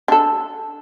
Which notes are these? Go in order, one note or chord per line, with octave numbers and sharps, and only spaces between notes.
D4 A4